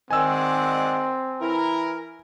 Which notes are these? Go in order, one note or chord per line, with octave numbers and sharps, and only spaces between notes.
D#3 G#3 C4 D5 F#5 G#5 E6
E3 E4 A#4